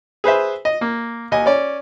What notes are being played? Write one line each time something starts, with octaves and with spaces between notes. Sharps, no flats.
G#4 B4 C5 E5
D#5
A#3
D#2 D#5 G#5
C#4 D5